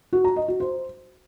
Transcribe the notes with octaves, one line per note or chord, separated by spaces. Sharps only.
F#4
A#5
D#5
F#4
C5